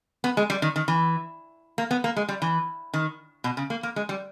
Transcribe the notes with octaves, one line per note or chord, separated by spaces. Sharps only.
B3
G#3
G3
D#3
D#3
E3
A#3
B3
A#3
G#3
G3
E3
D#3
B2
C#3
A#3
A#3
G#3
G3